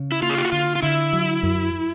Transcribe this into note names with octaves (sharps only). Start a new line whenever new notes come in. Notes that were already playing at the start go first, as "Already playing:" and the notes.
Already playing: C#3
E4
A#3 F4
G#4
G4
F#4
D3 F4
F4
D3 E4
F#3
F#2